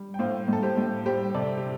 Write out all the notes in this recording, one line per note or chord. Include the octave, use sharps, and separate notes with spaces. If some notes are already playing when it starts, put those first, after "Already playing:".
Already playing: G3
G5
A2 C5 F5
A2 A4
G4 C5
A2
G3 G4 C5
C3 A4 D5
G4